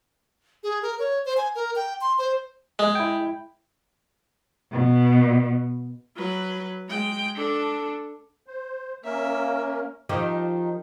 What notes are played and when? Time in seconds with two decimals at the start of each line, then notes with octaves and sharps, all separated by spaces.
0.63 G#4
0.82 A#4
0.99 C#5
1.25 C5
1.37 G#5
1.55 A#4
1.76 G5
2.01 C6
2.19 C5
2.79 G#3
2.95 E4 G5
4.72 B2
6.16 F#3 B4
6.88 G#3 G5
7.36 D4 A4
8.47 C5
9.04 A#3 C#4 A#4 E5
10.09 D#3 F3 G4